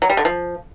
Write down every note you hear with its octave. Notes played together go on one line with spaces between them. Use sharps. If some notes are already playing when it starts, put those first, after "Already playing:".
F#3
G3
D3
F3